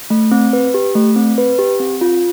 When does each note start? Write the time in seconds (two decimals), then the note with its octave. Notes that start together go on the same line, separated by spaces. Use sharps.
0.10 A3
0.32 C4
0.53 B4
0.74 G4
0.95 A3
1.16 C4
1.38 B4
1.58 G4
1.80 C4
2.01 F4